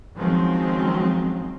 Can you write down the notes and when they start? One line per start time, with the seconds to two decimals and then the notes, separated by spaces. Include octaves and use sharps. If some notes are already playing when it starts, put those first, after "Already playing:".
0.15 D#3 F3 F#3 G#3 C4 C#4